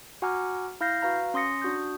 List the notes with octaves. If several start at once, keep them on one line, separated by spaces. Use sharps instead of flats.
F#4 F#5 G#5 A#5 D6 F6
E4 F5 F6 G6 A#6 C7
F#4 B4 F5 A#5
C#4 C6 D#6 A#6 C#7
D4 F#4 D#6 G6